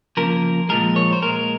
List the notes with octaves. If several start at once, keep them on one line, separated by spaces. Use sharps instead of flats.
C#3 F3 A#3 A#4
A#2 F3 G#3 A#4
C#5
C5
A#2 G#3 A#4